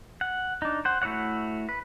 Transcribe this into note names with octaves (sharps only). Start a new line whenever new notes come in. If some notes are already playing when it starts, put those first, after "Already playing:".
F#5
D4 D#4
C5 F#5
A3 E4 F#4 C#5 F#5
B4